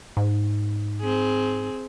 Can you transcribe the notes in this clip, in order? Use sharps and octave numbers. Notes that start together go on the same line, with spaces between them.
G#2
C4 G#4